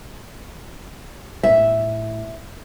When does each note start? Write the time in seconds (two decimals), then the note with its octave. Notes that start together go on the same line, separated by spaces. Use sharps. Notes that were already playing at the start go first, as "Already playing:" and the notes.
1.43 A2 E5